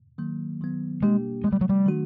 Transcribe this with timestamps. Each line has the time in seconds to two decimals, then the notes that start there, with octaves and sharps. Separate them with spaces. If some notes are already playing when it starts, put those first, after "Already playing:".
0.18 D#3 F#3 A#3
0.61 D#3 F#3 B3
1.02 B2 G3 G#3 A#3 D4 G4
1.44 C3 F3 G#3 A3
1.52 G3
1.61 F#3
1.69 G3
1.86 D#3 F#3 A3 D4 F#4